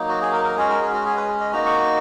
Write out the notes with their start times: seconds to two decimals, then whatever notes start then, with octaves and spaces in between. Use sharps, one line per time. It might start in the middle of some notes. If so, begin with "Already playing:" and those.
Already playing: F#3 A#3 D#4
0.09 F#4
0.21 G#4
0.32 A#4
0.44 A#4
0.56 G#3 C#4 F#4 G#4
0.69 A#4
0.81 G#4
0.93 F#4
1.05 G#4
1.16 B4
1.41 D#5
1.53 A#3 D#4 F#4 A#5
1.66 C#6